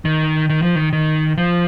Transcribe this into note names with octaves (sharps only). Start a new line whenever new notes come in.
D#3
D#3
F3
D#3
D#3
F3